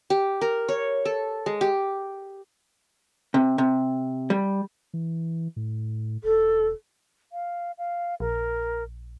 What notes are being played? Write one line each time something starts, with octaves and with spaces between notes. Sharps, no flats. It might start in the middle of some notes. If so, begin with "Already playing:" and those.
G4
A#4
C#5
A4
G#3
G4
C3
C3
G3
E3
A2
E1 A4
F5
F5
A#1 A#4